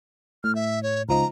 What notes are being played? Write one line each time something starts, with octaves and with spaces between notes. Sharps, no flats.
A2 F6
E5
C#5
C#2 F3 D#4 A#5